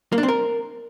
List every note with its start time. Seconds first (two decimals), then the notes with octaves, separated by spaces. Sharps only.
0.12 A#3
0.18 D4
0.23 C4
0.28 A#4